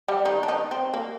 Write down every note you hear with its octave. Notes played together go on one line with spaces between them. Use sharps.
G3 G4
D#3 D#4
D4
D#3 D#4
C4
A#3